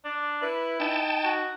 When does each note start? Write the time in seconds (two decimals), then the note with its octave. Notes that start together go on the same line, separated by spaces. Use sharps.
0.04 D4
0.42 E4 B4
0.80 D#4 G5 A5
1.24 F#4